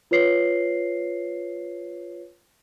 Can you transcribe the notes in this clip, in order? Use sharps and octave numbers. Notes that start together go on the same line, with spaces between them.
F4 B4 C#5 C7